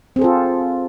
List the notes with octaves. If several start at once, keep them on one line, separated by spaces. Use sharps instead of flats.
C4 F4 G#4 A4